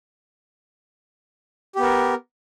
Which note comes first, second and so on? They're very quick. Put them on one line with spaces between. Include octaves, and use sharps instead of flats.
G4 B3 A#4